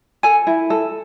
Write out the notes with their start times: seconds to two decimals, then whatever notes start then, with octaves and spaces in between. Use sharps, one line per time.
0.23 A4 G#5
0.47 E4
0.70 A4